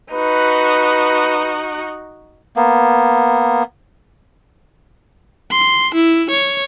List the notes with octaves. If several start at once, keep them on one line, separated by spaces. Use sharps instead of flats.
D#4 F#4 B4
A#3 B3
C6
E4
C#5